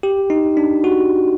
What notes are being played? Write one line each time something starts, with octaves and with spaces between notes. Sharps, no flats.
G4
D#4
D4
F#4